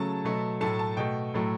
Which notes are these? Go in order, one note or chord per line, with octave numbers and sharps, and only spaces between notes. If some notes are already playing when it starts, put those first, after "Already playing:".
Already playing: C#3 F#3 A3 A5
B2 F#3 A3
A2 F#3 A3 A5
A5
B2 A3 G5
A2 F#3 A3